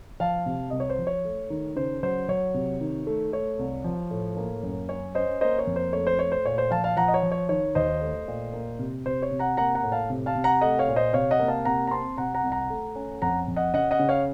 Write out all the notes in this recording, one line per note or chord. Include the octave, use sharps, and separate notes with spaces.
F3 F5 A5
C3
C2 D#5
C#5
C5
F3
C#5
A3
D#3
C#3 C5
F#3 C5
F#3 C#5
C3
D#3
A3
A3 C#5
C2
F3
A2
A#3
F#2
C#4 C#5
C#4 C5 D#5
A#3 C5 D#5
C#5
F2
C5
A3 C#5
C5
A3 C#5
C5
A#2 C#5
C5
F3 F5 A5
F5 A5
F3 F#5 A#5
D#5
C#5
F3
C#5
D#3 C#5
D#2 C5 D#5
A3
A#2
A#3
C3
C3 C5
C#5
C3
F#5 A#5
A#3 F#5 A#5
F#5 A#5
A2
F5 A5
C3
F5 A5
C3
F#5 A#5
A3 D#5 F#5
C#5 F5
A#2
C5 D#5
C3 C#5 F5
D#5 F#5
A#3
F5 A5
C3 F#5 A#5
A#5
C4 A5 C6
C3 F#5 A#5
F#5 A#5
C2
F#5 A#5
A3
C#4
F2 F#5 A#5
F2
D#5 F#5
C#3 D#5 F#5
D#5 F#5
C#3
C#5 F5